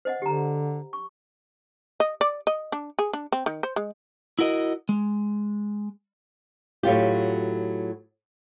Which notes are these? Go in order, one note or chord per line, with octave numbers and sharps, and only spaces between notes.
C5 D#5 F#5
D3 G4 A#5
C#6
D#5
D5
D#5
D4
G#4
D4
C4
D#3
C5
G#3
E4 F#4 A#4 D#5
G#3
A2 F#3 F4 G4